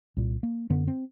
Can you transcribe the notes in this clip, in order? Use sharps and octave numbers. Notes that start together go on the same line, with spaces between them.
C2 A#2
A#3
F#2 D3 B3
C4